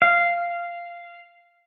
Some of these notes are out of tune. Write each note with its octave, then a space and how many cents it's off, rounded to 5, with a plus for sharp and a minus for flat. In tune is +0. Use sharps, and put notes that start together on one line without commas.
F5 -10